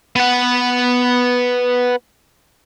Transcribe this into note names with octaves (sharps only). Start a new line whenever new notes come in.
B3 F#5